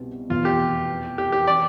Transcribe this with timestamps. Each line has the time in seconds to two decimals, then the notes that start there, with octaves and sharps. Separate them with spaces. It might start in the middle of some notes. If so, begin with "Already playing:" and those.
Already playing: C2 B2 C4
0.30 F1 E2 B2 F4
0.45 G4
1.18 G4
1.32 G4
1.47 E3 D5